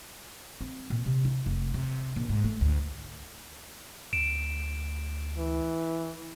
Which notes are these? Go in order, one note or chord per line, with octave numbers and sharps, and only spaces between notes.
C4
A#2
C3
E4
F1
C3
A#1
G#2
A3
D2
D2 D7 E7
E3